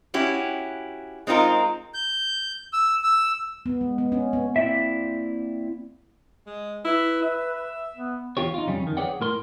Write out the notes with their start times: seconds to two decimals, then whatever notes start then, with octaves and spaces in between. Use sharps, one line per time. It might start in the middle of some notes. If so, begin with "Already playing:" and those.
0.14 C#4 E4 F#4 G4
1.27 G#3 C4 D#4 F4 A#4
1.94 G6
2.73 E6
3.04 E6
3.66 B3
3.81 G#3
3.98 B3
4.12 C#4
4.33 B3
4.56 A#3 C4 E4 D5 E5
6.47 G#3
6.85 E4 B4
7.22 E5
7.96 B3
8.37 E2 F4 G4 C#5
8.54 D#4 F4
8.68 F2 C#3 G3 C#4
8.83 F2 D#3
8.97 G#4 B4 C#5 D5 F#5 G5
9.21 A2 A#4 C6